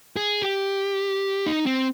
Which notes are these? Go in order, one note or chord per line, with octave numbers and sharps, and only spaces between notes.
G#4
G4
D#4
C4